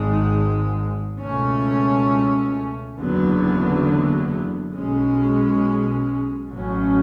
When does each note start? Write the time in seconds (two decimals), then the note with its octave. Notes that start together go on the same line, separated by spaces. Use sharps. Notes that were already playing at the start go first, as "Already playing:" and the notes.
Already playing: G#1 G#2 G#3
1.19 C#2 B2 A3 C#4
2.96 F#1 E2 D3 F#3 B3
4.74 B1 B2 G#3 C#4
6.52 A1 A2 F#3 C#4